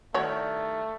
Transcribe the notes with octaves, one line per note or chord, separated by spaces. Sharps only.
G2 D#3 A3 E4 F#4 C#5